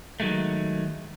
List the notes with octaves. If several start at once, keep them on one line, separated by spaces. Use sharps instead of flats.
D#3 F#3 G#3 A3